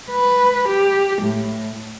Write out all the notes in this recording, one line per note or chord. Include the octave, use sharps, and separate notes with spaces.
B4
G4
A2